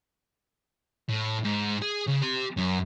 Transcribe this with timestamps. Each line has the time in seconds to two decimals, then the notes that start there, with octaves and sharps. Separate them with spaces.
1.09 A2
1.44 G#2
1.82 G#4
2.08 C#3
2.22 G4 C6
2.57 F#2